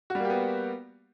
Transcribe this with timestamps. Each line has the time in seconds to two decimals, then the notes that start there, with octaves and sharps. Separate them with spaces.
0.10 F#4
0.15 G3
0.20 A#3
0.25 G4
0.30 B3